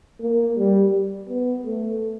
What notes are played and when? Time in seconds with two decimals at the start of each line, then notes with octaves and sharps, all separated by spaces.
0.21 A#3
0.57 G3
1.29 B3
1.65 A3